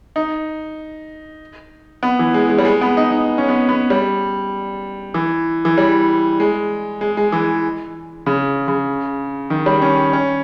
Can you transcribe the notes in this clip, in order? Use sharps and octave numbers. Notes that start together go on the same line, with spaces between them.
D#4
B3
E3
G#3
G#3
G3
G#3
B3
D#4
D#4
C#4
B3
B3
G3
E3
E3
G3
G#3
G#3
G#3
E3
C#3
C#3
D#3
G3
C#4
C#4